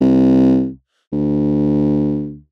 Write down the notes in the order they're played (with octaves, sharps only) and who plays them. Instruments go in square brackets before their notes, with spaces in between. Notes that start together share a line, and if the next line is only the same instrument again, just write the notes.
[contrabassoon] C2
D2